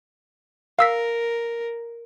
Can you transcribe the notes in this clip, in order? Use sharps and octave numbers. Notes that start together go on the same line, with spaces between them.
A#4 F5 E6 B6